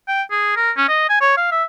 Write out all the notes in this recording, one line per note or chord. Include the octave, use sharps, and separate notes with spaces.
G5
G#4
A#4
C#4
D#5
G#5
C#5
F5
E5